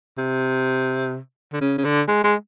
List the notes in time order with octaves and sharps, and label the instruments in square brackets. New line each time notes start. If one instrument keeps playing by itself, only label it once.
[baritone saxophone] C3
D3
C#3
C#3
D3
G#3
G#3